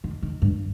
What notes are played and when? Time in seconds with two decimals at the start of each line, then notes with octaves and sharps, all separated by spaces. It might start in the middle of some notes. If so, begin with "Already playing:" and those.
0.04 D#3
0.22 D#3
0.42 G2